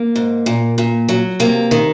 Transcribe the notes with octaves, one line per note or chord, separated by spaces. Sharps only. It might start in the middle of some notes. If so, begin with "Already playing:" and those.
Already playing: A#3
G#2
A#2
A#2
F#3
C3 A#3
D#3